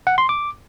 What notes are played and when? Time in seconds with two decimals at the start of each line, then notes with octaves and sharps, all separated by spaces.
0.07 F#5
0.18 C6
0.29 D6